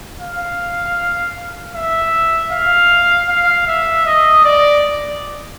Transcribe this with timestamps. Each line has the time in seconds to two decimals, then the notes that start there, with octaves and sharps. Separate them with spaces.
0.21 F5
1.75 E5
2.52 F5
3.28 F5
3.67 E5
4.06 D#5
4.44 D5